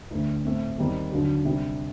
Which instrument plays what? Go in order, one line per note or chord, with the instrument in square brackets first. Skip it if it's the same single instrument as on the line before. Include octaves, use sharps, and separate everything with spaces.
[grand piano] D2 D3 A3
A2 A3 C4
D#2 D#3 G3 C4 D#4
D#2 D3 F#3
C3 G3 D4